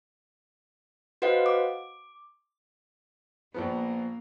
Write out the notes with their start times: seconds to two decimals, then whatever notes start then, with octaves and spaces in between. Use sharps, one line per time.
1.22 F#4 B4 C5 D#5 F5 F#5
1.46 D6
3.54 A#1 F3 A#3 B3